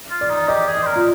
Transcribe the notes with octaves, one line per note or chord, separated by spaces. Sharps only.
F4
D5
D#4
G4 D#5
G#4
D5
C5
A#4
F4